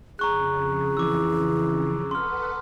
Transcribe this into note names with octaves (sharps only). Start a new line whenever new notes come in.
F2 C#3 G#4 A#5 C#6 F#6
E3 D6 E6
A4 B4 F#5 C6 F6